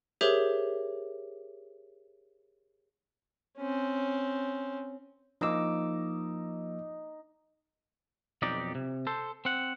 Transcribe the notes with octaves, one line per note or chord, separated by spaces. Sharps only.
G4 G#4 A#4 C5 C#5 E5
C4 C#4
F3 A#3 D#4 D6 E6
B1 F2 D#4 G4 D5
C3
A4 C5
C4 F#5